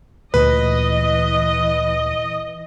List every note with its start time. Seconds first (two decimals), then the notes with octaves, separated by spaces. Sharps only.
0.34 D2 A#2 E3 B4 D#5